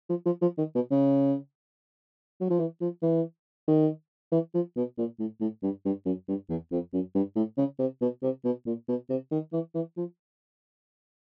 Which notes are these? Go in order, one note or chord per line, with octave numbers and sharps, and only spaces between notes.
F3
F3
F3
D#3
B2
C#3
F#3
F3
E3
F3
E3
D#3
E3
F3
B2
A#2
A2
A2
G2
G2
F#2
G2
E2
F2
F#2
G2
A2
C#3
C3
B2
C3
B2
A#2
B2
C3
D#3
E3
E3
F3